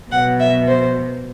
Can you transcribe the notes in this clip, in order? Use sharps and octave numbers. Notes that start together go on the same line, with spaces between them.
B2 F#3 B3 F#5
E5
C5